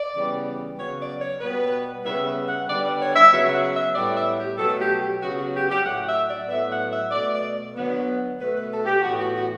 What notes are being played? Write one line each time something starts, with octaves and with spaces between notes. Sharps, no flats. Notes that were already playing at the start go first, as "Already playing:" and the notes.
Already playing: D5
C#3 E3 G3 B3
C#3 F#3 B3 C#5
D5
C#5
B2 G3 B3 B4
C#3 G3 B3 E5
E5
F#5
D3 G3 B3 D5
D5
C#5
E5
C#3 F#3 B3 E5
F#5
E5
A2 G3 B3 D5
E5
G4
B2 F#3 A3 A4
G4
G4
C#3 F#3 B3 F#4
F#4
G4
G4
A2 F#3 A3 F#5
E5
D5
A2 F#3 B3 E5
F#5
E5
B2 A3 D5
D5
D3 F#3 B3
B2 A3 B4
B4
A4
G4
A2 E3 B3 F#4
F#4
F#4